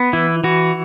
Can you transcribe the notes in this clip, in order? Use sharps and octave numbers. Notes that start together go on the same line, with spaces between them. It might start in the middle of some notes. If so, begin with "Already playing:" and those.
Already playing: B3
E3 E4
E3 F#4